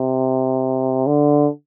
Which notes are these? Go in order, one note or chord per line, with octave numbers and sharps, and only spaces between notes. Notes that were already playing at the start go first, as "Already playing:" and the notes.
Already playing: C3
D3